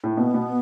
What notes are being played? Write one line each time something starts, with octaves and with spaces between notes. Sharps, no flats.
A2
B2 B3
B2